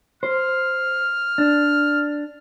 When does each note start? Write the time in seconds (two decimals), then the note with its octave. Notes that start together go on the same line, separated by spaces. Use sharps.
0.23 C5 F6
1.38 D4